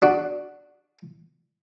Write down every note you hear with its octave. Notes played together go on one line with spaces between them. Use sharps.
D4 F#4